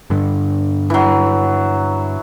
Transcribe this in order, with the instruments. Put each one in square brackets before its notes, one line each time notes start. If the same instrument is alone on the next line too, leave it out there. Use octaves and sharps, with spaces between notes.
[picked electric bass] G2 D3
[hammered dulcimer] E3 F#3